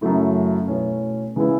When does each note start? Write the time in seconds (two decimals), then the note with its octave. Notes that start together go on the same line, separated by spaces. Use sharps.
0.01 F#2 C#3 F#3 A3 E4
0.68 B2 A3 C#4 E4
1.36 C#3 E3 G#3 B3 E4